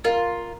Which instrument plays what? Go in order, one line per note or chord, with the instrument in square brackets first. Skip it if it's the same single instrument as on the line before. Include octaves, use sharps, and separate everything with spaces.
[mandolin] F4 [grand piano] A#4